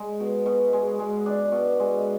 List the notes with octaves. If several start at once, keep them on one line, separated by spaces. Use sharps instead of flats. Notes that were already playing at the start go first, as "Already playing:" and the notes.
Already playing: G#3
B2
B2
G#3
G#3
D4
B2
G#3